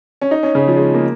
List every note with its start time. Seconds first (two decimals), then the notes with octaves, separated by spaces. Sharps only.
0.21 C#4
0.31 D#4
0.43 C#4
0.55 C#3
0.68 F3
0.76 G#3
0.94 A#3